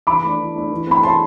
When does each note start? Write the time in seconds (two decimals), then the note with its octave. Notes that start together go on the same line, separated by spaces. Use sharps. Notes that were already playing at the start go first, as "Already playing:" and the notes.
0.07 E3 B5 D6
0.24 A3 D4
0.39 E3
0.55 A3 D4
0.71 E3
0.87 A3 C4 B5
1.03 E3 A5 C6